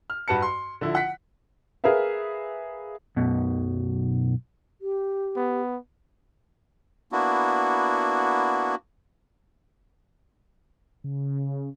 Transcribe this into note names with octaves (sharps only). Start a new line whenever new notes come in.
F6
G2 F#4 B4 A5 C#7
C6
D3 F3 E4
F#5 B6
G#4 A#4 B4 E5 F5
B1 F#2 B2
G4
B3
A#3 B3 D4 E4 F#4
C#3